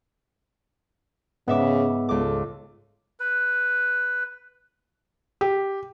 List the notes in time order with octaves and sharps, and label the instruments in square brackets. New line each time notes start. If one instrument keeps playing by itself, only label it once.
[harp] G#2 E5 D6 [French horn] C#3 [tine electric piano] B3
[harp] C#2 D6 [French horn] A4
[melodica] B4
[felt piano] G4